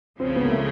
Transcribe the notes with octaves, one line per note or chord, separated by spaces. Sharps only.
C#2 C#3 F3 C4
B3
A#3
A3